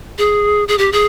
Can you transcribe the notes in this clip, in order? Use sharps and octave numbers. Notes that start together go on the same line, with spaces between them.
G#4
G#4
G4
G#4